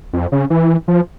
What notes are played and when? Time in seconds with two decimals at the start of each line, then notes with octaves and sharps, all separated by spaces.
0.13 F2
0.32 C#3
0.50 E3
0.88 F3